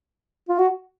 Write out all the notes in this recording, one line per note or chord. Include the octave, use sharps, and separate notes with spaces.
F4
F#4